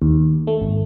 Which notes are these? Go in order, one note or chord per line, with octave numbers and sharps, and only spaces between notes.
D#2
A3
G#1